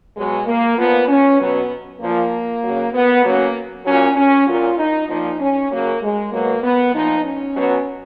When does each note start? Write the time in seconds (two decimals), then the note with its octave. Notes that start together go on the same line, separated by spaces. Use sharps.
0.16 B2 F#3 G#3
0.47 A#3
0.77 A#2 F3 B3
1.08 C#4
1.39 B2 F#3 B3
2.01 A#2 F3 A#3
2.63 C#3 F#3
2.93 B3
3.24 C#3 F#3 A#3
3.85 A#2 F#3 C#4
4.16 C#4
4.47 A#2 F#3 F4
4.78 D#4
5.08 A#2 F3 D#4
5.40 C#4
5.70 C#3 F#3 A#3
6.02 G#3
6.31 B2 F#3 A#3
6.63 B3
6.94 A#2 F3 D#4
7.25 C#4
7.56 B2 F#3